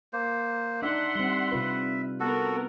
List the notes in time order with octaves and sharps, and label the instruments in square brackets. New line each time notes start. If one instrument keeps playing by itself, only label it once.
[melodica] A#3 C5
[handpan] D4 D#4 [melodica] E5 [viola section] F#5 C6
[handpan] G3 C4
C3 F4 B4
[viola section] B3 A#4 [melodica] F#4 A4